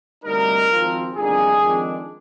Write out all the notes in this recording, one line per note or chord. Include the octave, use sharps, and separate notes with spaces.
D2 C3 G3 A#3 D#4 A#4
G#1 G#2 F3 C4 F4
G1 F2 D#3 A#3 D4 G#4
F2 D#3 G#3 D4